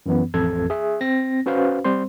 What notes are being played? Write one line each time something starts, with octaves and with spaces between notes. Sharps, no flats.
F#2 E3 B3
A1 F2 A4 G#6
G#4 E5
C4 A#6
C#4 F#4 B4 C5 F5
G3 C4 C5 C6